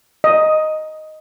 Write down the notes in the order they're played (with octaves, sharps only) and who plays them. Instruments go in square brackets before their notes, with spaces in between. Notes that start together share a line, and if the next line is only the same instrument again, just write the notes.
[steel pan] D#5